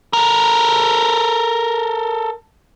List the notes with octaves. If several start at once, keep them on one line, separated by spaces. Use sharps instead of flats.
A4 A#4